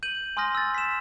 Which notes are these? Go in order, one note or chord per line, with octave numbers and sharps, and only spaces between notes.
G6 D#7 F#7
G#5 C6 D#6 F6 G6 A#6
E6 A6
B6 E7